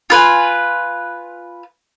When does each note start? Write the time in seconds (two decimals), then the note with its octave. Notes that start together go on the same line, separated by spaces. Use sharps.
0.10 F4 B4 G#5